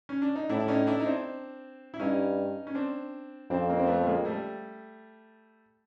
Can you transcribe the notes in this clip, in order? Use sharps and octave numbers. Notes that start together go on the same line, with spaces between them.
C#4
D4
D#4
A2 D4 E4
D4
C#4 D#4
D4 E4
D#4
C4 D4
E4
G2 C#4 D#4
C#4
C4 D4
F2 C4 D4
A#3 C4
C4
A3 B3
A3
G#3 A#3
G3 A3